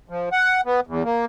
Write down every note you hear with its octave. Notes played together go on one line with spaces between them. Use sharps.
F3
F#5
B3
E2
A#3